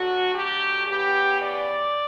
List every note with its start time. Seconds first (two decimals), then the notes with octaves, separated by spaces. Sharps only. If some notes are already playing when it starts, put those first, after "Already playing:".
Already playing: D3 F#3 A3 F#4
0.34 G4
0.87 C#3 E3 B3 G4
1.42 D5